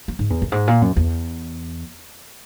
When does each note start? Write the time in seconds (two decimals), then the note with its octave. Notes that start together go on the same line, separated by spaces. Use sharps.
0.08 F#3
0.19 G#2
0.30 E2
0.42 F#2
0.52 G#2
0.68 A#2
0.82 F#2
0.97 E2